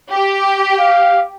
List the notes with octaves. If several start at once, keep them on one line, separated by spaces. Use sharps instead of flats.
G4
F5